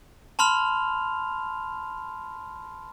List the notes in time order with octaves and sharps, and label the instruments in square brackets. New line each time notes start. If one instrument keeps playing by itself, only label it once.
[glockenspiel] A5 B5 C6 F6 F7